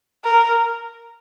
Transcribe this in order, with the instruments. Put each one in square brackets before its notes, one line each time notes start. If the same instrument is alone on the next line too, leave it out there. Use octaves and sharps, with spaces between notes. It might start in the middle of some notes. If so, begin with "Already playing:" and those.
[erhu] A#4